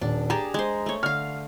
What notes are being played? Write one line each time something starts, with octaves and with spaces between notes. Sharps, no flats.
D#1 D4
G4 G#4 A5 A#5
G#3 C5
A3 C#5
D3 F5 F6